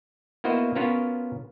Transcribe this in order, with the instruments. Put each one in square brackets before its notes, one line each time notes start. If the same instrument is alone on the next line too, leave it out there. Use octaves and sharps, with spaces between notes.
[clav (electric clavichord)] A#3 B3 E4 F#4 C5 D#5
B3 C#4 F4 F#4 A#4 C#5